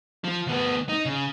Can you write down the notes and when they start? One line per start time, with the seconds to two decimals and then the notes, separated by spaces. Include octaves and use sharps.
0.24 F3
0.47 D2 B3
0.89 D#4
1.05 C#3